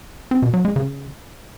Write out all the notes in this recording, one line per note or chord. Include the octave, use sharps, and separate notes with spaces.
C4
B2
F#3
G#3
C#3